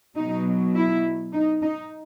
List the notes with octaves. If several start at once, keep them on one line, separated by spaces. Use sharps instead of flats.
B2 F#3 D#4
E4
D#4
D#4